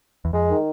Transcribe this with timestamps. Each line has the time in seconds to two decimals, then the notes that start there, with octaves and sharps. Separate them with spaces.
0.25 E2
0.33 F2 G#3
0.50 D#3